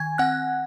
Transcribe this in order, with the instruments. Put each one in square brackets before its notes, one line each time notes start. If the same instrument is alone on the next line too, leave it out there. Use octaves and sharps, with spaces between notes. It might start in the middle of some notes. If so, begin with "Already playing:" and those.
Already playing: [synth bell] D#3 G#5 G#6
C4 F#5 F#6